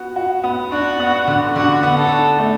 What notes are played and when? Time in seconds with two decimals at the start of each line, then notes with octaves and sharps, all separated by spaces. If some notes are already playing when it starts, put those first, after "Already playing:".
Already playing: B3 F#4
0.16 F#4
0.44 B3
0.72 D4 F#4
1.00 B3
1.28 D3
1.55 D3 F#4
1.83 B3
1.97 A4
2.12 D4
2.38 A3